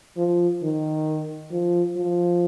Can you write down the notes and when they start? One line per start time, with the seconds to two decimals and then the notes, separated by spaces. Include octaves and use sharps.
0.17 F3
0.63 D#3
1.52 F3
1.97 F3